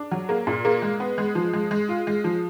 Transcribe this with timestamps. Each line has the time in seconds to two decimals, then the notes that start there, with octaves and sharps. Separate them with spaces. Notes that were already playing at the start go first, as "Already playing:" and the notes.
Already playing: D4
0.11 F#3
0.29 A#3
0.47 A#2
0.65 A#3
0.82 G#3
1.00 B3
1.18 G#3
1.35 F3
1.53 G#3
1.71 G#3
1.89 F4
2.07 G#3
2.24 F3